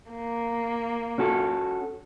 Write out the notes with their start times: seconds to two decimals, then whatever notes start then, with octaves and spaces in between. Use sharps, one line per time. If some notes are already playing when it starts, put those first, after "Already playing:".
0.11 A#3
1.18 C#4 F#4 A4